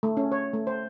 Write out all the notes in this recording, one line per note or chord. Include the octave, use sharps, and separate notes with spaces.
A3
C#4
C#5
A3
C5